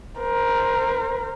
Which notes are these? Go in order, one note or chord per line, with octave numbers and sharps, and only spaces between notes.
A#4 C5